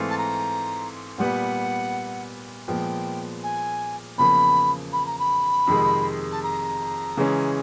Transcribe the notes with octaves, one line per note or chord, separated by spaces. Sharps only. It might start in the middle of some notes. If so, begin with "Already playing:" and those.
Already playing: G#2 E3 A3 C4 F4
A5
A#5
A#2 G3 B3 F#5
A#2 F3 G#3 B3 G5
G#5
E2 C#3 F3 A#3 B5
B5
A#5
B5
F2 C3 D#3 G#3
A5
A#5
C#3 E3 G#3 C#4